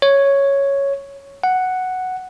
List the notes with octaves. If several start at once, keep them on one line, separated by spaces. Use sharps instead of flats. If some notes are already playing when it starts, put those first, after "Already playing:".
C#5
F#5